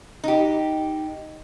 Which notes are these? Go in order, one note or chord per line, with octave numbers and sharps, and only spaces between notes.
D#4 G4